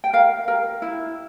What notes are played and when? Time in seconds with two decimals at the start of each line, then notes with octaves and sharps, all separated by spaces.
0.04 G5
0.13 A#4 F5
0.48 A#4
0.82 E4